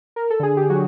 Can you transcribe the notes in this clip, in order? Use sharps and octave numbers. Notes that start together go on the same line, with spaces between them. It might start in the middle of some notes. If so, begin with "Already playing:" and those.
A#4
A4
D3 G#4
G4
F#3 F#4